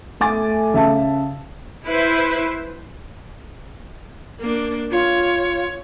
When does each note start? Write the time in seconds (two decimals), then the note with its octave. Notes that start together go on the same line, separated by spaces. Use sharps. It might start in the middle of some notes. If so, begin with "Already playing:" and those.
0.21 A3 G#5 D6 A6
0.74 C#3 E5 A5
1.86 E4 B4 C5
4.39 A#3 D4
4.91 F4 C#5